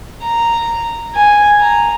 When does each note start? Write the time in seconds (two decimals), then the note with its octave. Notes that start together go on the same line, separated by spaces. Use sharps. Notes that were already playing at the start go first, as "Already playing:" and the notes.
0.22 A#5
1.15 G#5
1.61 A#5